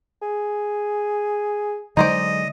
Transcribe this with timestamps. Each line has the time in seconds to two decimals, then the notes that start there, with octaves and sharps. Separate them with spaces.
0.22 G#4
1.97 D3 F#3 G#3 D#4 C5 D5 D#5